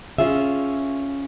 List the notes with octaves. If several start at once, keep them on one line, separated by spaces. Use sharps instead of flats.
C#4 F4 G#4 E5